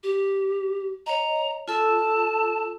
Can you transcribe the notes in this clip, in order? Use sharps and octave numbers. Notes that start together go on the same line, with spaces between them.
G4
C#5 D#5 A#5
F4 A4 A5 E6